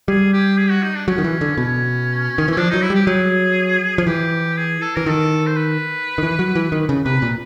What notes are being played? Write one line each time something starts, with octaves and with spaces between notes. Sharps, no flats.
G3 G#4
G4
G#4
F#4
D#4
D4
F#3 C#4
D#3
E3
D3
B2 C#4
D#3
E3 C#4
F3 D4
F#3 D#4
E4
G3 G4
F#3 G#4
F3
E3 G4
G#4
A4
E3 A#4
D#3 A4
C5
B4
D#3
E3
F#3
E3
D#3
C#3
C3 B4
A#2